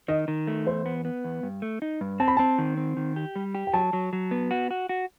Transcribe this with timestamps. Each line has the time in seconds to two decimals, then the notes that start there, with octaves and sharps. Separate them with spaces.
0.08 D#3 D#5
0.28 D#3
0.47 A3
0.67 E2 C5
0.86 B3
1.05 B3
1.24 E2
1.43 G2
1.62 A3
1.82 D#4
2.01 G2
2.20 C4 A5
2.28 B5
2.37 C4 A5
2.58 D#3
2.77 C4
2.97 D#3
3.16 G4
3.36 G3
3.55 G4
3.67 G5
3.73 F#3 A5
3.93 F#3
4.13 F#3
4.31 B3
4.51 F#4
4.71 F#4
4.89 F#4